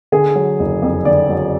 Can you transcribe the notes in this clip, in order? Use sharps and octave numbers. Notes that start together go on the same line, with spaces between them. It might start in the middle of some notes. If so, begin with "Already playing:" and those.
D3 G#4
F#3
F#1
F2
D3 D5
F#3